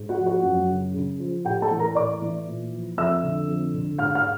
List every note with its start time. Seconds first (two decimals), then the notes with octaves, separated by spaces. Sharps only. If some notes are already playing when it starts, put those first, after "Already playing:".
Already playing: G#2
0.09 F#4 F#5
0.18 F3
0.26 F#4 F#5
0.43 F#2
0.69 C#3
0.94 C#3
1.19 F3
1.45 A2 G4 G5
1.62 A4 A5
1.71 E3
1.79 A#4 A#5
1.95 A2 D5 D6
2.22 E3
2.46 A#2
2.72 F3
2.97 F2 E5 E6
3.23 D3
3.48 F2
3.74 D3
3.98 G#2 F5 F6
4.15 F5 F6